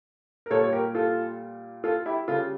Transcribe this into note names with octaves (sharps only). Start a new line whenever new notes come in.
A#4
A#2 G3 A4 C#5
C#5
G4 A#4
F4 A4
F4 A4
E4 G4
C#3 G3 F4 A4